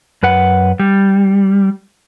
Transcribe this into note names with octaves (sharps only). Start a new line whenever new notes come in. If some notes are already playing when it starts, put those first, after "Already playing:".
F#2 B4 F#5
G3